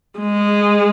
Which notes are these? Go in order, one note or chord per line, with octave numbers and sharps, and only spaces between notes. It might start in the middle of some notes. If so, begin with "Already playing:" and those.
G#3